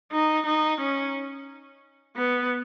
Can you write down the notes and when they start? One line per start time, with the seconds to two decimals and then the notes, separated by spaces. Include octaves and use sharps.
0.12 D#4
0.46 D#4
0.80 C#4
2.16 B3